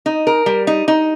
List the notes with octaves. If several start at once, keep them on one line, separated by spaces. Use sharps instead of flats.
D#4
A#4
G3
D#4
D#4